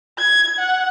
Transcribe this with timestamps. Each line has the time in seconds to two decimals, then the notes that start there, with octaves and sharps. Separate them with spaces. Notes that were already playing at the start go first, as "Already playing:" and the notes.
0.18 G#6
0.59 F#5